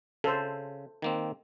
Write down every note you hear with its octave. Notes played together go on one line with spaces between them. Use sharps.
C#3 A4 C5
D#3 A#3 C4